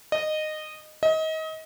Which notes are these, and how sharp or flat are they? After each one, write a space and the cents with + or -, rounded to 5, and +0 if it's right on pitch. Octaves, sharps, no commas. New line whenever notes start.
D#5 -15
D#5 +30